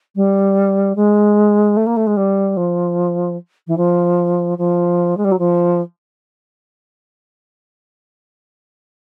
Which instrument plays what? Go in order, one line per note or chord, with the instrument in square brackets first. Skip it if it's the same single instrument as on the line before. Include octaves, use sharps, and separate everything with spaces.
[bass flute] G3
G#3
A3
A#3
A3
G#3
G3
F3
E3
F3
F3
G#3
G3
F#3
F3